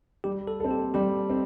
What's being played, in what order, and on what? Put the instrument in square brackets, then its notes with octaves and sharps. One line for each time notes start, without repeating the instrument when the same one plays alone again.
[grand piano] G3 [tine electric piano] G4
[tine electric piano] A4
[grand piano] C4 A4
[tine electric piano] G4
[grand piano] G3 [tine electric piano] G4
[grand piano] C4